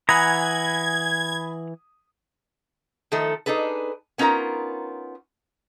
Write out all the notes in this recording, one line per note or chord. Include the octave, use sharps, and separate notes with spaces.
E3 F#5 G#5 A#5 B5 D#6 G#6
D#3 F3 A3 A4
D4 D#4 G#4 A4 B4
B3 C#4 D#4 F4 A#4 A#5